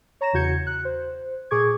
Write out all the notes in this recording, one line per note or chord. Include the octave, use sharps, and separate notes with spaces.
C#5 A#5 A#6 E7
E2 C#3 F#4 G6 G#6 C#7
F#6
C5
A#2 G#4 C#6 D6 G#6